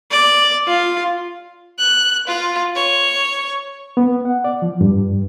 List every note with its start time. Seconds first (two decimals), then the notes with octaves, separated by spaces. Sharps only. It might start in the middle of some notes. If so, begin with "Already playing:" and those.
0.11 D5
0.67 F4
1.78 F#6
2.27 F4
2.75 C#5
3.97 B3
4.25 F#5
4.44 D5
4.62 F3
4.81 G2